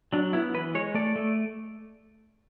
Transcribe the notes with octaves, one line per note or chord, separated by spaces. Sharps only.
F#3 D4
B3 E4
E3 B4
G#3 C#5
A3 D5
A3